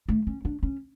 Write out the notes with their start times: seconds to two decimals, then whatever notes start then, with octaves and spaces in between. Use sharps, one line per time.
0.09 A3
0.27 C#4
0.45 D4
0.63 C#4